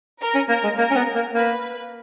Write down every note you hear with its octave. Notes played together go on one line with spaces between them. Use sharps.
A#4
C#4
A#3 A#4
G#3
A#3 A#4
C#4
B3
A#3
A#3 B4